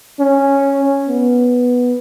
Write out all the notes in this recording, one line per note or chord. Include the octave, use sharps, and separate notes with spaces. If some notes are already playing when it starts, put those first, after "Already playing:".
C#4
B3